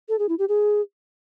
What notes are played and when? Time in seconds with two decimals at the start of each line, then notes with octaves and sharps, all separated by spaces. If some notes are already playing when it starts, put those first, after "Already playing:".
0.09 A4
0.19 G#4
0.29 E4
0.39 G4
0.49 G#4